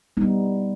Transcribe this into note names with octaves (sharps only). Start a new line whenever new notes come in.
G3 B3 D#4